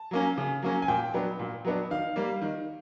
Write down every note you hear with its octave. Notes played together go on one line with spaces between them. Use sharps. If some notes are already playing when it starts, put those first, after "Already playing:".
Already playing: A5
F#3 A#3 C#4
C#3
F#3 A#3 C#4
G#5
A#2 G5
F#3 B3 D4
A#2
F#3 B3 D4
D#3 F5
G3 A#3
D#3